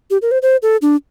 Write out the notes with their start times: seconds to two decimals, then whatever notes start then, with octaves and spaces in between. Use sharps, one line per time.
0.11 G4
0.22 A#4
0.31 C5
0.42 C5
0.63 A4
0.82 D4